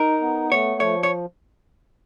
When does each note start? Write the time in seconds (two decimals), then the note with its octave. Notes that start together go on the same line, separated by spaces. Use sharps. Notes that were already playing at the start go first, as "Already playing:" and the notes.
Already playing: D#4 A#4
0.21 B3
0.51 A3 C#5
0.80 F3 C#5
1.03 C#5